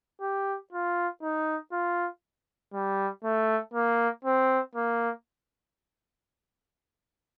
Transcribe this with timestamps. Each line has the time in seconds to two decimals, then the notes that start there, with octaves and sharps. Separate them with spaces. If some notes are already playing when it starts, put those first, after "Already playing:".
0.21 G4
0.73 F4
1.22 D#4
1.72 F4
2.73 G3
3.24 A3
3.74 A#3
4.25 C4
4.75 A#3